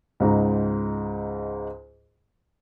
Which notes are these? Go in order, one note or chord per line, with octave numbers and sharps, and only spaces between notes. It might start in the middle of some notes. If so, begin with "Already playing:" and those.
C#2 G#2 G#3 A#5